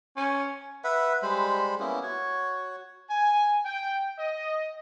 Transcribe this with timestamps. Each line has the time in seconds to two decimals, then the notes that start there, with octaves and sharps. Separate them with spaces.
0.17 C#4
0.84 B4 E5 F#5
1.22 G3 G#3 C5 B5
1.80 A#3 B3 C#4 E4
2.03 F#4 C#5
3.10 G#5
3.65 G5
4.18 D#5